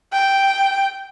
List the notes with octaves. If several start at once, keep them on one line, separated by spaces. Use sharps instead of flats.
G5